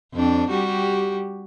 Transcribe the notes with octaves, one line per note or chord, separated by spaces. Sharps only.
F2 C4 D4
G3 F#4 G4